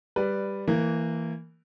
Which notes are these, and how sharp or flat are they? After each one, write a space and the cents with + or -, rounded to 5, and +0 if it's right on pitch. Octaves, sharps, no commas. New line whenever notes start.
G3 +10 B4 +0 D5 +0
E3 +0 A#3 -20